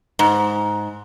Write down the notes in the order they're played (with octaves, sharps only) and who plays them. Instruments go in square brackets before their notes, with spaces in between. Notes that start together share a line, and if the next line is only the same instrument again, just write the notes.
[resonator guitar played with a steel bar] G#2